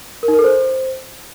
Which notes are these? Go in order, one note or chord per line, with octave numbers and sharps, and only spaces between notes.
A#4
D#4
A#4
A4
C5